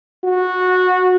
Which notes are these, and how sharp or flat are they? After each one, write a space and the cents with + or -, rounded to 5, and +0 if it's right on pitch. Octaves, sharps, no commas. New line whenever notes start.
F#4 -15